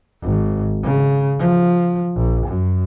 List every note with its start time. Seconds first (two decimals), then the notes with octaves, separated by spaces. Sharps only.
0.22 G#1
0.83 C#3
1.39 F3
2.16 A#1
2.47 F#2